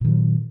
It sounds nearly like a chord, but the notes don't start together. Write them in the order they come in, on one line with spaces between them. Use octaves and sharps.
A#2 D#3 F#3